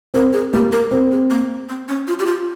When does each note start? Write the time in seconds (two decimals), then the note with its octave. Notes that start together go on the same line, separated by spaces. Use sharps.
0.14 C4 A#4
0.33 G#4
0.53 A#3 G4
0.72 A#4
0.91 C4 A#4
1.12 G#4
1.30 A#3
1.69 C4
1.89 C#4
2.08 F4
2.19 G4
2.26 F4